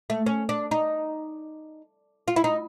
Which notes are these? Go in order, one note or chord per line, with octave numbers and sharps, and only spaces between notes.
A3
C#4
D4
D#4
F4
E4
D#4